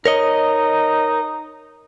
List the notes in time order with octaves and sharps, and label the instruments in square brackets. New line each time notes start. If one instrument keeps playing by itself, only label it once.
[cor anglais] D#4 [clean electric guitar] A#4 C#5 D#5